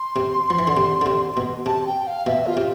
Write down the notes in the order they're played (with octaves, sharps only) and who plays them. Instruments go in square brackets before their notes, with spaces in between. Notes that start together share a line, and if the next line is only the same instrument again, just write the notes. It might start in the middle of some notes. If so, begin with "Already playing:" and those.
Already playing: [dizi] C6
[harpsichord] C3
F3
E3
D3
C3
D3
C3
B2
[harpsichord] C3 [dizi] A5
[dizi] G5
F5
[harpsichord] B2 [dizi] E5
[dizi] F4
[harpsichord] C3